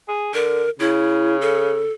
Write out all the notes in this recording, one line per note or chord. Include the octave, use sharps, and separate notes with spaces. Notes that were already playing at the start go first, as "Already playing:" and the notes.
G#4
D3 A#4
C#3 E4
A4